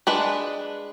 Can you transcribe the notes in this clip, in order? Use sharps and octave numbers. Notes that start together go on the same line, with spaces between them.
G#3 D4 B4